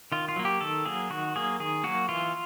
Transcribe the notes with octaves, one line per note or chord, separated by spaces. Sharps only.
D#3 F4
F4
F#3 A#3
G4
D#3 A4
F#3 A#3 G#4
D#3 F#4
F#3 A#3 G#4
D#3 G#4
F#3 A#3 F#4
E3 F4